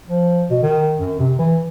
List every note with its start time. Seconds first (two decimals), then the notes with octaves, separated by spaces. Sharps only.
0.08 F3
0.50 B2
0.62 D#3
0.98 F#2
1.19 C3
1.39 E3